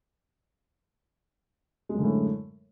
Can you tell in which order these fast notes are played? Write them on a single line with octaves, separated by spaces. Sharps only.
G#3 F#2 D3 A2